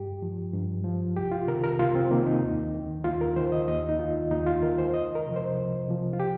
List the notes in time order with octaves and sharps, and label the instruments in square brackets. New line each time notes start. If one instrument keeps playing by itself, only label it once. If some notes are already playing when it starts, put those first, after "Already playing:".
Already playing: [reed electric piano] G2 G4
F3
G2
F3
C2 G4
F4
C3 D#3 A#4
A#4
C2 F4
C4
C3 D#3 A#3
D#4
D#2
D#3
D#2 F4
A#4
D#3 C5
D#5
D#2 D#5
D#4
D#3 F4
D#2 D#4
F4
D#3 A#4
C5
C2 D#5
A#4
C3 F3
C5
C2
C3 F3
F4
G4